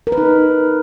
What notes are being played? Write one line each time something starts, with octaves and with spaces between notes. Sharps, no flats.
A#4
B4
D#4